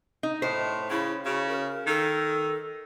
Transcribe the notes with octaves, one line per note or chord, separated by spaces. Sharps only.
D#4
A2 C5
C#3 E4
C#3 F#4
A#4
D#3 A4